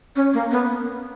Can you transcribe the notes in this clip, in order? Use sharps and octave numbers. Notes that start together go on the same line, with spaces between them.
C#4
A#3
B3